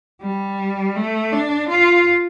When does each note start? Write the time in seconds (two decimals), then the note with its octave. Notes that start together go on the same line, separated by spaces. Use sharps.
0.22 G3
0.96 A3
1.32 D4
1.69 F4